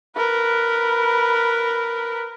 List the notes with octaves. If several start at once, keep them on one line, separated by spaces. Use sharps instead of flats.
A#4 B4